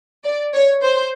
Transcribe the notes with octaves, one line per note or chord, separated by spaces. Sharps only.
D5
C#5
C5